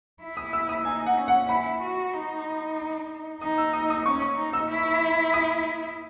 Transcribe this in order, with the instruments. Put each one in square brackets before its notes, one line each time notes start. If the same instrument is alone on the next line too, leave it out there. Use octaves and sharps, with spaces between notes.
[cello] E4
[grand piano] D#6
E6
D#6
[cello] D#4 [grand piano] G#5
[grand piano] F#5
[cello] C#4
[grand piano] F#5
[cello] E4 [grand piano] B5
[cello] F#4
D#4
[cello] D#4 [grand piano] D#6
[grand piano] E6
D#6
D#6
[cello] C#4 [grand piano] C#6
[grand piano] D#6
[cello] D#4
[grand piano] E6
[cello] E4
[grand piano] D#6